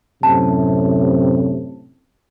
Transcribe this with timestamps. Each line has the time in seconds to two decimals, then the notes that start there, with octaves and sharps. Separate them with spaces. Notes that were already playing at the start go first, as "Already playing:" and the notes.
0.23 F#2 A2 C3 A5